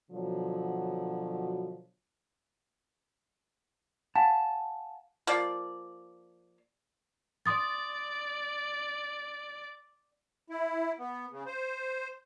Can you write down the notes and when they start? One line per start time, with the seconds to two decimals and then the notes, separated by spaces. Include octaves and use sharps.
0.11 B2 D3 F3 F#3
4.16 F5 F#5 G#5 A5
5.27 F3 A#3 D5
7.46 D5 C6 D#6 A6
10.50 E4
10.99 B3
11.31 C#3
11.46 C5